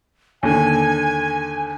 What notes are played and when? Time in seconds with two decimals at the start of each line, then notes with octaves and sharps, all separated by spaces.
0.43 D#2 D3 G#5